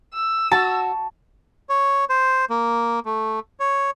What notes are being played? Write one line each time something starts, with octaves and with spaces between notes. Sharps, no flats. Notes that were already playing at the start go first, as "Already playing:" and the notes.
E6
F#4 A5
C#5
C5
A#3
A3
C#5